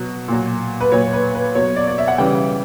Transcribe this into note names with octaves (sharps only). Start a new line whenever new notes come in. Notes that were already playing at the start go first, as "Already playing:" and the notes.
Already playing: B2 F#3
A#2 F#3
B4
A#2 F#3 C#5
B4
B4
B2 F#3 C#5
D5
D5
E5
F#5
C#3 E3 G3 G5